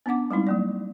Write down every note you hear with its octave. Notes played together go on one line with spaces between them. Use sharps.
B3 C#4 D4 F#5 D6
G3 G#3 C4 D#4 E4
F#3 A#3 D5